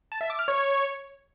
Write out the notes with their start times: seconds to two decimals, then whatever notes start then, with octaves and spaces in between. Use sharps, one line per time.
0.12 A5
0.21 E5
0.30 D6
0.39 F6
0.48 C#5